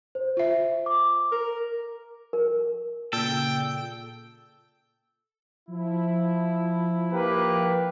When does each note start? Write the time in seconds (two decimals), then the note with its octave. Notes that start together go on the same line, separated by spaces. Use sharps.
0.15 C5
0.37 F4 E5
0.86 D6
1.32 A#4
2.33 A#4
3.13 A#2 C#3 A4 G5
5.70 F3 E4
7.13 A#3 G4 B4